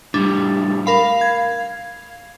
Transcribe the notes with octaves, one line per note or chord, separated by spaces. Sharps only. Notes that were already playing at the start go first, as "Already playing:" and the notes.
A2 G3 D4
A#4 F5 B5
G#6